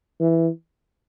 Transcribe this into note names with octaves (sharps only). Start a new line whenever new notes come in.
E3